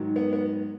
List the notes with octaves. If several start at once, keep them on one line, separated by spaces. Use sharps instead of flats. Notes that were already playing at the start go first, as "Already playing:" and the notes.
Already playing: G#2 D#3 F#3
B3
B3